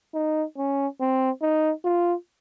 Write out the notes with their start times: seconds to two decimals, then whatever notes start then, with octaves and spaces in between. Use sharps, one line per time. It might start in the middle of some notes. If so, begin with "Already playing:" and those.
0.14 D#4
0.57 C#4
1.00 C4
1.42 D#4
1.85 F4